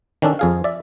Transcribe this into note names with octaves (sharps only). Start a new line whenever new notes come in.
D#3 C#4 D4 A4
F2 G#4 F5
D5 E5